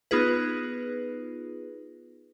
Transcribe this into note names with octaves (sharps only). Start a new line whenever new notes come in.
B3 D#4 F4 G#4 B4